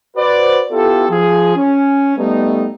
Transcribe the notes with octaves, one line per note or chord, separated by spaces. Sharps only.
F#4 B4 C5 D5
B3 E4 F4 G4 A4
F3 G#4
C#4
G3 A3 B3 D#4